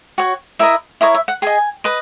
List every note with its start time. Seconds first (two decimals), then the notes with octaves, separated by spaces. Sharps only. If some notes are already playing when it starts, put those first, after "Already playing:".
0.18 F#4 C#5
0.59 E4 A#4 D#5 E5
1.01 E4 A#4 C#5 D#5
1.14 E5
1.28 F#5
1.42 G#4 D#5 G#5
1.84 B4 D#5